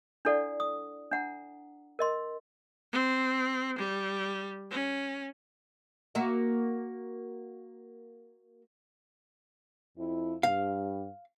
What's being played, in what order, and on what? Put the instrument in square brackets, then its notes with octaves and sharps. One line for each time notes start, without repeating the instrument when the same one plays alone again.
[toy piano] D4 E4 A4 D5 F#5
D#6
D4 F#5 A#5
A#4 D#5 C6
[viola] C4
G3
C#4
[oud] A#3 F#4 E5
[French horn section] F2 E4
[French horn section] G2 [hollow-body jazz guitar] F5